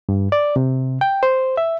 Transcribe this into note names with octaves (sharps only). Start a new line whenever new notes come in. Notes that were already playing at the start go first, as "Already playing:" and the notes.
G2
D5
C3
G5
C5
E5